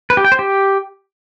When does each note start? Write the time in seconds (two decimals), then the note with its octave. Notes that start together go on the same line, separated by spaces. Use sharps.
0.10 B4
0.17 G4
0.24 G5
0.32 C5
0.39 G4